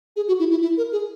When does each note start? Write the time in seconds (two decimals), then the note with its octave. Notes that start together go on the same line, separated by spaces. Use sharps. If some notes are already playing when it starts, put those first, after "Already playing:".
0.16 G#4
0.28 F#4
0.39 E4
0.51 E4
0.62 E4
0.77 A#4
0.92 G#4